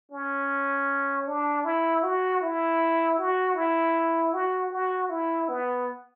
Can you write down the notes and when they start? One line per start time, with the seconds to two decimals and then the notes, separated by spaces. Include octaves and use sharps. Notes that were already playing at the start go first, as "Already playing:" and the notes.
0.11 C#4
1.27 D4
1.65 E4
2.03 F#4
2.41 E4
3.18 F#4
3.56 E4
4.33 F#4
4.71 F#4
5.09 E4
5.48 B3